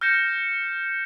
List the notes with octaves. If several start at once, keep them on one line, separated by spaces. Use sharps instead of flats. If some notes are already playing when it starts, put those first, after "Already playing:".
F6 G6 A#6 C#7 E7